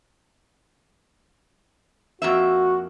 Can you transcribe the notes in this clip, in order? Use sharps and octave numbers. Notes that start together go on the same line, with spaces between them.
F2 A#3 F#4 E5